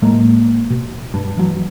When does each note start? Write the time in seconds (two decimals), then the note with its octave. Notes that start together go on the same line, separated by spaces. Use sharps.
0.02 A2 F#3 G#3 A#3
0.70 B2
1.14 G2
1.37 E3 F#3